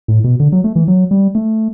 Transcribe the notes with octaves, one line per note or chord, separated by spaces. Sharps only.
A2
B2
D3
F#3
A3
E3
F#3
G3
A3